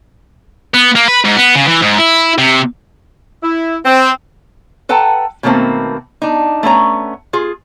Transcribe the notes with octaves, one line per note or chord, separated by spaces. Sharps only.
B3
A#3
B4
G#2
B3
C#3
E3
G#2
E4
C3
E4
C4
A4 B4 F#5 G5 A5 A#5
B2 D#3 A3 A#3 C4
D4 D#4
A3 B3 C#4 A#5
F4 G#4